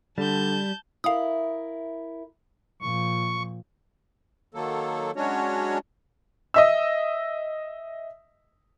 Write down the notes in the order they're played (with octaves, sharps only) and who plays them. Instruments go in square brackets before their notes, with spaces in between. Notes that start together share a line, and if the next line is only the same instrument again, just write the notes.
[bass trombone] D3 [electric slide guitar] G3 [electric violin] A5 G6
[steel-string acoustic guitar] E4 A#4 [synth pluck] F5 D#6
[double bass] A#2 F3 [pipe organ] C#6
[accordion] D#3 F#3 A#3 A4
F#3 G#3 C#4 D4 F#4 C#5
[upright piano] D#5 E5 E6